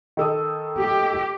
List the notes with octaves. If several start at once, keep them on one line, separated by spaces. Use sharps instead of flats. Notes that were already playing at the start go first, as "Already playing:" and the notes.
D#3 A4 D#6
G4